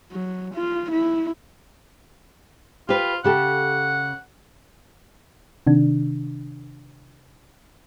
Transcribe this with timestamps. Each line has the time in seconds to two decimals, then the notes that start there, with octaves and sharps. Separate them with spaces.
0.12 F#3
0.55 F4
0.91 E4
2.89 F4 G4 B4
3.24 C#3 G4 A4 F#5
5.67 C3 D#3 D4